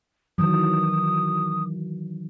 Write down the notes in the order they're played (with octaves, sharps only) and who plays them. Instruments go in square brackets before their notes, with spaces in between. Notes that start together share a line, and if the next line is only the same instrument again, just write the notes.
[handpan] D#3 E3 F#3 [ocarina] D#6